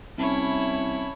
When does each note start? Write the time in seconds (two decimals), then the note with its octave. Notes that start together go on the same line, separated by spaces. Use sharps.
0.18 C2 C#4 E4 C#5 E5 A5 B5